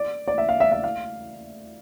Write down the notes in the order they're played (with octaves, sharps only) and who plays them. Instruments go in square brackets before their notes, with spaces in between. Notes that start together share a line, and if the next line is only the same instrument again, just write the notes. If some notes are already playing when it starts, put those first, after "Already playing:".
Already playing: [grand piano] D5
D5
E5
F5
E5
E5
F5